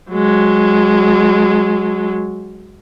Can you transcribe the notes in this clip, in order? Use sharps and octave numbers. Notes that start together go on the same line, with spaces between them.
F#3 G#3